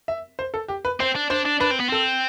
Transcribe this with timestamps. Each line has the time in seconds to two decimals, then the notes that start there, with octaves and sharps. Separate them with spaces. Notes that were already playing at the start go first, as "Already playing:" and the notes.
0.08 E5
0.39 C5
0.54 A4
0.68 G4
0.85 B4
1.00 C4 C5
1.15 D4
1.30 D4 C5
1.46 D4
1.60 D4 B4
1.71 C4
1.80 B3
1.89 C4 A4